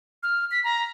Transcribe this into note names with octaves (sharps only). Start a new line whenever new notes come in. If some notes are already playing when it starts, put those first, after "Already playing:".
F6
B6
A#5